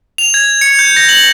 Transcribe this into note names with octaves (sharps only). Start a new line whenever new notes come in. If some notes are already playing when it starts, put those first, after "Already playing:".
F7
G#6
C#7
G6
A#6
F#7